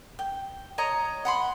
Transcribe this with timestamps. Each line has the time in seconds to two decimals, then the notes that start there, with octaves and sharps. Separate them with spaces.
0.19 G5
0.78 C#5 D#5 A#5
1.25 F#5 B5 C6